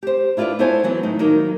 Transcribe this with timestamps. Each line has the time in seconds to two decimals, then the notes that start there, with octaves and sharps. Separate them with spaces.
0.03 G4 C5
0.37 D4 E4 F4 G#4 B4 D5
0.59 B3 E4 A4 C5 C#5 G#5
0.84 E3 F#3 B3
1.03 A2 D#4
1.19 D#3 F#3 A#3 D#4